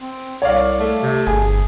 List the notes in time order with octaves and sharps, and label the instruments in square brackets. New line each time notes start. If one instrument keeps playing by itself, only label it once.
[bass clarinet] C4
[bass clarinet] C2 [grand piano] C#5 D5 F5
[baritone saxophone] A3
[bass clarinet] C3
[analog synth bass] G1 [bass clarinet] G#4 [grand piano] G#5